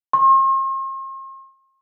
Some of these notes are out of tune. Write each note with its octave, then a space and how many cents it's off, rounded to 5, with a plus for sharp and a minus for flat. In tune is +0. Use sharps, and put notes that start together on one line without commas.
C6 +45